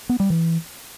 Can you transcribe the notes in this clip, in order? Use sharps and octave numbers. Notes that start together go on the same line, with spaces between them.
B3
G3
E3